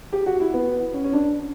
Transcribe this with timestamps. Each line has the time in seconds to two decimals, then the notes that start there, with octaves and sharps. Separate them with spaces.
0.13 G4
0.26 F#4
0.40 E4
0.54 B3
0.94 C#4
1.04 C#4
1.13 D4